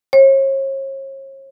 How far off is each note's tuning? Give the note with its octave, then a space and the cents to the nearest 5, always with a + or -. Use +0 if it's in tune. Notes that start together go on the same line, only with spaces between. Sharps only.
C#5 -40